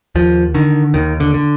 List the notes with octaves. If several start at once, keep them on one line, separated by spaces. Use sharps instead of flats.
D#2 F3
D3 D#3
D#2 D#3
D3
D3